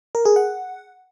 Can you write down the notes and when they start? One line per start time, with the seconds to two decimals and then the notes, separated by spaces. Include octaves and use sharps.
0.15 A#4
0.25 G#4
0.36 F#5